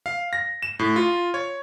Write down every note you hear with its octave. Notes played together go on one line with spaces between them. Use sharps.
F5
A#6
E7
A2
F4
C#5